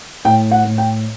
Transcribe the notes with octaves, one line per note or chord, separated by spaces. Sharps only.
A2 G5
F#5
A2
G5